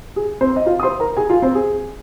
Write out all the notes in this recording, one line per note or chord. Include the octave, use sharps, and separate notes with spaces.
G#4
C4 C5
D#5
F4 F5
D#6
C5 C6
A#4 A#5
G#4 G#5
F4 F5
C4 C5
G#4